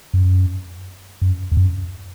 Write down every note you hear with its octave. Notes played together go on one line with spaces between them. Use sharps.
F#2
F#2
E2
F#2